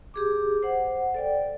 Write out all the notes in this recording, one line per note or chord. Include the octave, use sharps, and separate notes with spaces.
G4 G#4 D6
C5 F#5
A4 D5 G5